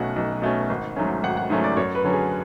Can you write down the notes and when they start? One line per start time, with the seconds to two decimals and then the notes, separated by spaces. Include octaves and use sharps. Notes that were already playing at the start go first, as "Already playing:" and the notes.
Already playing: B1 B2 A3 C#4 F#5
0.16 B1
0.42 B2 A3 C#4
0.69 G#1
0.96 G#2 F#3 A3 C#4
1.23 G#1 F#5
1.37 F#5
1.50 G#2 F#3 A3 C#4
1.64 D5
1.77 F#2 C#5
1.95 B4
2.04 D3 F#3 C#4
2.13 G#4